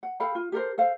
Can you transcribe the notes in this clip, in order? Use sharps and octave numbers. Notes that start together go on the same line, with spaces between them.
F#5
A4 F5 G5 B5
F4
G4 A4 A#4 C5
A4 C5 F5